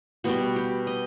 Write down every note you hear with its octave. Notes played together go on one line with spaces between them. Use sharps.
B2 G3 B3 F#4
G4
D#5